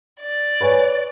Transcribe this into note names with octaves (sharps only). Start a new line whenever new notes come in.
D5
B4 C#5 G#5